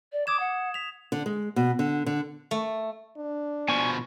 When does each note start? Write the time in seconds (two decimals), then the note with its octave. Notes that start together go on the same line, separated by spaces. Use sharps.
0.12 D5
0.27 D6 D#6 G#6 E7
0.40 F#5
0.74 B6 F7
1.12 D3
1.26 G#3
1.56 B2
1.79 D3
2.06 D3
2.51 A3
3.17 D4
3.68 B2 F3 G#5 C#6